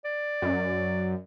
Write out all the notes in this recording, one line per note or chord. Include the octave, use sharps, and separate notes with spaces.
D5
F#2